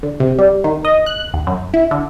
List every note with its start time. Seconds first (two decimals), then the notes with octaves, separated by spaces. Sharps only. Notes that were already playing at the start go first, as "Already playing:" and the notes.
0.03 D3
0.20 C3
0.39 G3
0.64 D#3
0.85 D#5
1.06 F#6
1.34 D#2
1.47 F#2
1.74 E4
1.91 D3